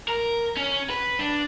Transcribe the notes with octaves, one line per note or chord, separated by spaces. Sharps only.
A#4
C#4
B4
D4